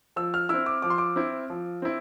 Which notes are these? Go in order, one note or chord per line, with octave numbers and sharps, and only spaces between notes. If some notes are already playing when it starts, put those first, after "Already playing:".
F3 E6
F6
C4 E4 E6
D6
F3 D6
C6
D6
C4 E4
F3
C4 E4